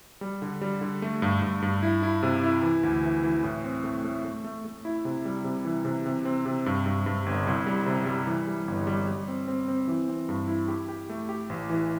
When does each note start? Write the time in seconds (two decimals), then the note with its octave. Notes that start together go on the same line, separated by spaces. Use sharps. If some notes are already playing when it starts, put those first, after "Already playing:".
0.21 G3
0.42 D3
0.61 G3
0.81 D3
1.02 A3
1.22 G2
1.42 G2
1.62 G2
1.83 E4
2.03 E4
2.23 C3
2.43 E4
2.63 E3
2.83 D2
3.04 E3
3.24 E3
3.43 A2
3.64 C4
3.84 A3
4.04 A3
4.25 A3
4.44 A3
4.65 A3
4.85 E4
5.05 C3
5.25 G3
5.44 C3
5.65 E3
5.85 C3
6.06 C3
6.25 C4
6.46 C3
6.66 G2
6.86 G2
7.06 G2
7.26 G1
7.47 C2
7.67 G3
7.86 C3
8.06 G3
8.27 E3
8.47 G3
8.68 G1
8.87 G3
9.08 G3
9.28 C4
9.48 C4
9.68 C4
9.88 E3
10.08 C4
10.29 G2
10.48 E4
10.68 G4
10.89 G4
11.09 A3
11.29 G4
11.50 A1
11.70 E3